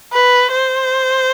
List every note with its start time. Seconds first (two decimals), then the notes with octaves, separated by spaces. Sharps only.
0.13 B4
0.52 C5